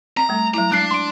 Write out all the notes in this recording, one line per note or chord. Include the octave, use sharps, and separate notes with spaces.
C4 A#5
G3 A3
F#3 E4 A#5
G#3 D4 F#6 C7
C6 D7